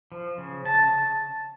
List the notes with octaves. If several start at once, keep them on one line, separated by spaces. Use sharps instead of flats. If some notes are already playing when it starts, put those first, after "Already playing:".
F3
C#3
C#3 A5